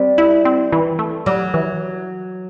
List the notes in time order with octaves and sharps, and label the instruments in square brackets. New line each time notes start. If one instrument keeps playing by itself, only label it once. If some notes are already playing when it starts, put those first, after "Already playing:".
Already playing: [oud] G3 [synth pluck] C4
[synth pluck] E4
C4
E3
A3
[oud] F#3 [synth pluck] G3
[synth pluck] E3